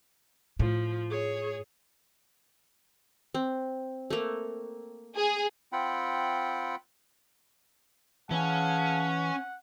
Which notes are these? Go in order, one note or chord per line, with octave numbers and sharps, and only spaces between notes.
A2 F3
G#4 C#5
C4
A3 A#3
G#4
C4 F4 F#5 G5 B5
E3 C#4 G#4 F5 F#5 A5